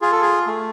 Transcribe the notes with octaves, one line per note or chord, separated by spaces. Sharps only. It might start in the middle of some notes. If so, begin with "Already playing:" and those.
F4 G#4
A4
G#4
A3